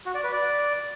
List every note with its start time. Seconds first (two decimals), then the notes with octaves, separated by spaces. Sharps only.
0.06 F#4
0.15 D5
0.24 B4
0.32 D5